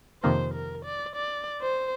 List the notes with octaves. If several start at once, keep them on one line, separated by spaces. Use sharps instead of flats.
F2 C3 D#3 A#3 C5
A#4
D5
D5
C5